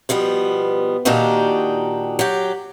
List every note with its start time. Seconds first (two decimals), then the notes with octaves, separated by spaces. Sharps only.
0.09 B2 F3 G3 B3
1.05 A#2 D#3 D4 D#4 F#4 G4
2.19 F#3 G4